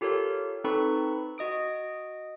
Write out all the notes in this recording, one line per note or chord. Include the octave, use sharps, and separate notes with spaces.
F4 G4 A4 A#4 C#5
C4 D#4 A4 B4 B5 C#6
F#4 D#5 D#6 D7